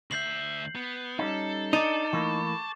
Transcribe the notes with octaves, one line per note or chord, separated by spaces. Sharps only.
D2 E5 G6 C7 F#7
B3
G3 C#4 D#4 A4
D4 D#4 D6 A6 E7
E3 A3 A#3 C#6